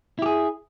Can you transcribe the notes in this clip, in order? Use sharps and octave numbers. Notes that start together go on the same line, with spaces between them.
E4 G4 G#4